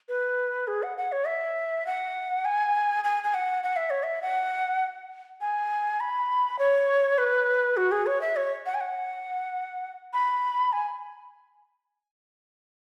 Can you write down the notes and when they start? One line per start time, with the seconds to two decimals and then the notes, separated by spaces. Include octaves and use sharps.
0.09 B4
0.67 G#4
0.83 F#5
0.97 F#5
1.12 C#5
1.27 E5
1.86 F#5
2.45 G#5
3.04 G#5
3.24 G#5
3.34 F#5
3.63 F#5
3.76 E5
3.90 C#5
4.03 E5
4.22 F#5
5.41 G#5
6.00 B5
6.59 C#5
7.18 B4
7.77 F#4
7.92 G#4
8.06 C#5
8.21 E5
8.36 C#5
8.66 F#5
8.74 G#5
8.81 F#5
10.13 B5
10.73 G#5